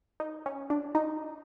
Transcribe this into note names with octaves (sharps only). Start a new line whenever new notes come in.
D#4
C#4
D4
D#4